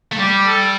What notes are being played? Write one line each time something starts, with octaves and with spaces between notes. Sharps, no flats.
A3
G3 G4
A4